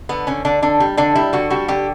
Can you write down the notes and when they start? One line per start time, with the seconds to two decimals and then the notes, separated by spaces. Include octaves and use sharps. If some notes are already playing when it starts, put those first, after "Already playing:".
0.09 D3 B3
0.27 D3 C#4
0.45 D3 D4
0.62 D3 D4
0.80 G3
0.97 D3 D4
1.15 G3 E4
1.33 D3 F#4
1.50 G3 F#4
1.68 D3 G4